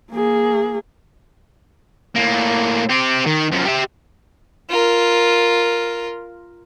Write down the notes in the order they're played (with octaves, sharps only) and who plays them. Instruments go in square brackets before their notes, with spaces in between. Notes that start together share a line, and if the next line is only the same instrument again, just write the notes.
[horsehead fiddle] A#3 G#4
[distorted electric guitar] A2 A#3
C4 G4
D#3
F#2 F3
G4 E5
[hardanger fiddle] F4 A#4